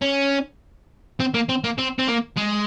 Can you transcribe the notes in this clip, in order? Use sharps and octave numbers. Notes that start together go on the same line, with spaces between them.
C#4
C4
A#3
C4
A#3
C4
C4
A#3
G#3